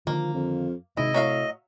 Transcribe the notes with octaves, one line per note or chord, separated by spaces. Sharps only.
D3 D#3 F3 A#3
F2
G#1 C3 C4 E4 D#5
A2 F#3 E5 F5